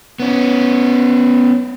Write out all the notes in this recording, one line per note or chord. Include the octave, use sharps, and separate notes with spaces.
B3 C#4